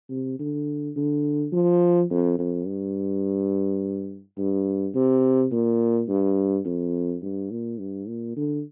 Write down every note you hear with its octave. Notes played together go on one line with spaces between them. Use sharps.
C3
D3
D3
F3
F2
F2
G2
G2
C3
A#2
G2
F2
G2
A#2
G2
A#2
D3